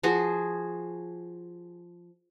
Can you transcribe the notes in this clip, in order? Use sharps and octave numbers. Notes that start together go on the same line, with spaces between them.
F3 F#4 G#4